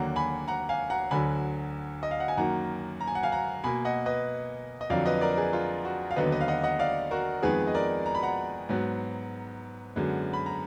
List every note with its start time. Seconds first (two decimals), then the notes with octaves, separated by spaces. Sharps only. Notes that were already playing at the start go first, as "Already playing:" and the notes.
Already playing: D#2 D3 F#3 A#3 F#5 A#5
0.16 G#5 B5
0.48 F#5 A#5
0.69 F5 G#5
0.90 F#5 A#5
1.11 D2 D3 F#3 G#5 B5
2.03 D#5
2.11 F5
2.20 F#5
2.28 G#5
2.37 F#2 D#3 A#3 F#5 A#5
3.01 A#5
3.07 G#5
3.15 F#5
3.23 F5 G#5
3.32 F#5 A#5
3.64 B2 A#3 G#5 B5
3.85 D#5 F#5
4.06 B4 D#5
4.81 D#5
4.90 F2 D3 F#3 D5 F5
5.05 B4 D#5
5.21 A#4 D5
5.37 G#4 B4
5.53 F4
5.85 F#4
6.11 F5
6.16 D#2 D3 F#3 B3 B4 D#5
6.32 B4 D#5
6.41 F5
6.48 D#5 F#5
6.63 D#5 F#5
6.79 D5 F5
7.11 F#4 A#4
7.43 F2 D#3 G#3 B3 G#4 B4
7.67 D#5
7.74 A#4 D5
8.06 A#5
8.15 B5
8.23 F#5 A#5
8.69 G#2 F#3 B3
9.96 F#2 D3 G#3 B3
10.33 B5
10.46 A#5